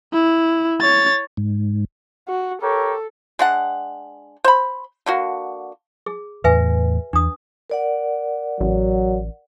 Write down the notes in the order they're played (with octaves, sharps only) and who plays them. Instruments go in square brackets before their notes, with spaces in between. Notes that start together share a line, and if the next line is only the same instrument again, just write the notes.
[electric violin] E4
C#5 A6
[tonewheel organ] G#2
[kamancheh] F#4
[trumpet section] G4 A#4 C#5 [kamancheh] A4
[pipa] G#3 D4 F#5
C5 B5
D3 A#3 F#4
[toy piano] G#4
[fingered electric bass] E2 A2 [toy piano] B4 E5 G#5
[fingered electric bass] E2 [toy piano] D4 D#6
[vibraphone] A#4 D5 F#5
[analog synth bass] A1 [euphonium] F#3